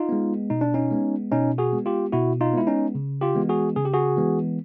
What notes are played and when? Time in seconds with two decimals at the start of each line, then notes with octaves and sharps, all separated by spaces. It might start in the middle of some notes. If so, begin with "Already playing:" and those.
Already playing: D#4 F4
0.09 G#3 B3
0.50 B2 D#4
0.61 D4
0.74 C#4 D#4
0.91 G#3 B3
1.32 B2 C#4 D#4
1.58 F#4 G#4
1.73 G#3 B3
1.86 F4 G4
2.13 B2 E4 F#4
2.41 D#4 F4
2.53 G#3 B3 E4
2.67 C#4 D#4
2.95 C#3
3.21 F4 G4
3.35 E3 G#3 B3
3.49 F#4 G#4
3.76 C#3 G#4
3.85 G4
3.94 F#4 G#4
4.17 E3 G#3 B3